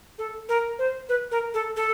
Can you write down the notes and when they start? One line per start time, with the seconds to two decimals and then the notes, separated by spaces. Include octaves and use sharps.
0.18 A4
0.49 A#4
0.79 C5
1.09 B4
1.31 A#4
1.54 A4
1.76 A4